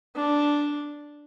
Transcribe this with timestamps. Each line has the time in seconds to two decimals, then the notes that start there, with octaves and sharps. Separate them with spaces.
0.16 D4